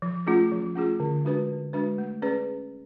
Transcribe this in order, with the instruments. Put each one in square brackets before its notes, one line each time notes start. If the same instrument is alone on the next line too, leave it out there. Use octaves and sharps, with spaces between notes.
[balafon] F3
A3 C#4 F4 G#4
F3
A3 C#4 F4 G#4
D3
G#3 D4 F#4 B4
D3
G#3 D4 F#4 B4
A3
C#4 G#4 B4 D5